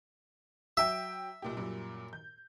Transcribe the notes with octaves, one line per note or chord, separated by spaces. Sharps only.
F#3 E5 G5
B1 A#2 G4
F#2 A#2 G3
G6